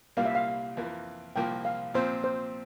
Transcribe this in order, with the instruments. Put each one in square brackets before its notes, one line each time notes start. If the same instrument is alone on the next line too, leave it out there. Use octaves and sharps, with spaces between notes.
[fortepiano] C2 A#2 G3 A#3 [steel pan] F5
[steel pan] E5
F5
[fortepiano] F2 E3 A#3
[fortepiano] C2 A#2 F3 A#3 [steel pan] G5
[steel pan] F5
[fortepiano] A#2 F3 C4 [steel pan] C5
[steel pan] C5